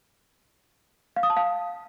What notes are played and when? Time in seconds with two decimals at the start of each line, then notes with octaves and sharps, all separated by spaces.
1.16 F5
1.23 D#6
1.30 A5
1.37 F5